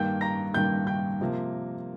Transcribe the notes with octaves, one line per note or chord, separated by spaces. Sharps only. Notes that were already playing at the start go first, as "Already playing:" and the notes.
Already playing: G2 D#3 A#3 G5 G6
A#5 A#6
G2 D#3 A#3 G5 G6
G5 G6
C3 F3 A#3